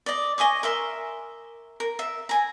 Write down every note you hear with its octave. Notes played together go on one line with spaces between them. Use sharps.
D5 D#5
D#5 G#5 C#6 D6
A#4 E5 C6
A#4
E5
G#5 A#5